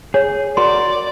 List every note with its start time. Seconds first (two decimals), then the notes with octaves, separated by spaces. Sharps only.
0.14 G#4 C#5
0.57 F#4 A#4 D5 C6